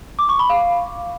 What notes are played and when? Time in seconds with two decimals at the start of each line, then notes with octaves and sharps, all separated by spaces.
0.19 D6
0.29 C#6
0.39 B5
0.50 F5